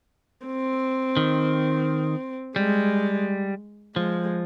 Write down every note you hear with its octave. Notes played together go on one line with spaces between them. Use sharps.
C4
D#3
G3 G#3
F3 G#3